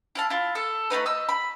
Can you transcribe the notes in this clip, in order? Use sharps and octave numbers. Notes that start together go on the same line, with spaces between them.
E4 F5 A5
E4 F4
A4
A3 B3 D#4 B4
D#5 E6
B5